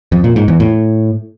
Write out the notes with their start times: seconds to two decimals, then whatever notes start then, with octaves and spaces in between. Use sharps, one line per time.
0.12 F2
0.24 A#2
0.36 G#2
0.48 E2
0.60 A2